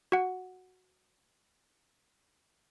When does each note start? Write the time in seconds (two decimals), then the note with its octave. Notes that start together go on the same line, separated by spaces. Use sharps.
0.12 F#4 F#5